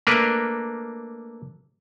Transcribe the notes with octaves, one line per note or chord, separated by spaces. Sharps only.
A3 A#3 D4 A#4 B4